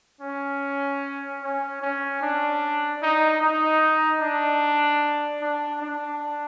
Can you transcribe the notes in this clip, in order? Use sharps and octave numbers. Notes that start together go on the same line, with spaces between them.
C#4
C#4
C#4
D4
D#4
D#4
D4
D4
D4